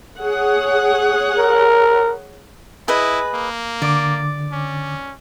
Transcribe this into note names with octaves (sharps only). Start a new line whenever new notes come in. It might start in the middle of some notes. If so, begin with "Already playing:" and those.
G#4 C#5 F#5
A#4
E4 G#4 B4 D#5
A#3
D3 D5 D6
C#4